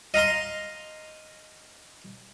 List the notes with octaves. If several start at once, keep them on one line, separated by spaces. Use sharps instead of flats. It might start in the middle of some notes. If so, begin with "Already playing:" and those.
D#5 F5 A#5 C6